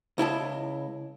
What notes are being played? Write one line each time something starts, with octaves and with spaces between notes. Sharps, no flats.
C#2 E4 D#5 A5